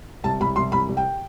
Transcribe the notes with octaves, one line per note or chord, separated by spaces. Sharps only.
C2 A5
C2 B5
C2 C6
C2 B5
C2
G5